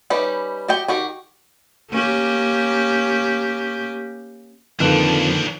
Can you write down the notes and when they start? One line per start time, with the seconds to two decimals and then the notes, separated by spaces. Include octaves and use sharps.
0.10 G3 C#4 D#4 G4 B4
0.68 F#4 G4 D#5 G5
0.88 D#3 F#4 G4
1.91 A#3 C#4 G4
4.80 F2 D3 D#3 F3 A#3 D4 B4 F#6